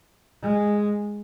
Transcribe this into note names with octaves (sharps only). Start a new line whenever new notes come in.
G#3